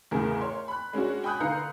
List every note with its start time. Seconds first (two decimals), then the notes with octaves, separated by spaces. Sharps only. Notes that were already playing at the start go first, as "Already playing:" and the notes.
0.11 E2 A2 C#3 G#4 A#4
0.41 C#5 C6
0.68 B5 F#6
0.93 G#3 C#4 D4 F#4
1.24 G5 G#5 B5 D#6 F#6 G6
1.40 D3 B4 F5 A#5 G6 C#7